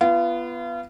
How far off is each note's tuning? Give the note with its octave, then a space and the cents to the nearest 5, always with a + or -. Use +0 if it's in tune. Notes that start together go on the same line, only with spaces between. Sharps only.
B3 +0 F4 -35